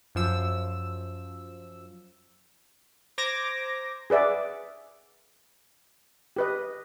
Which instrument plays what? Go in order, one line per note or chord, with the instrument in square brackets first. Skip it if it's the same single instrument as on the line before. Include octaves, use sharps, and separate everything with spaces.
[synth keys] F#2 F3 E6
C5 A#5 D6 G#6 A#6
[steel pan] G#4 B4 D5 E5 F#5
G4 B4 D#5